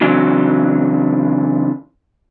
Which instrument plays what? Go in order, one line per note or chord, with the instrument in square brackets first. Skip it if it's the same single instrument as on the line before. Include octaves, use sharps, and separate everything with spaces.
[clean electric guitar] C#3 E3 F#3 C4 D4